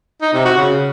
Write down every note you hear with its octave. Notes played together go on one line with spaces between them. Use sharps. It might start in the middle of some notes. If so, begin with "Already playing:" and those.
D#4
C3
F#4
C#3